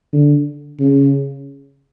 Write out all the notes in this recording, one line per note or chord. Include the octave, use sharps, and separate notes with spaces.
D3
C#3